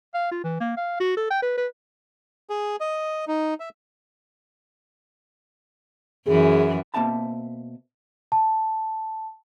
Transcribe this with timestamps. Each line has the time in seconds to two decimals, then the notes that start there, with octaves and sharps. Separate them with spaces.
0.14 F5
0.31 F4
0.44 E3
0.60 A#3
0.77 F5
1.00 F#4
1.17 A4
1.30 G5
1.42 B4
1.57 B4
2.50 G#4
2.80 D#5
3.28 D#4
3.60 E5
6.27 F#2 E3 G#4
6.94 B2 A#3 C4 E5 A5 B5
8.32 A5